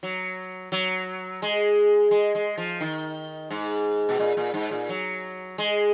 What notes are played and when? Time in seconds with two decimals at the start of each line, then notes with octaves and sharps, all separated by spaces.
0.03 F#3
0.72 F#3
1.42 G#3
2.11 G#3
2.35 G#3
2.57 F3
2.80 D#3
3.51 G#2
4.09 B2
4.19 A#2
4.37 A#2
4.54 G#2
4.71 A#2
4.89 F#3
5.58 G#3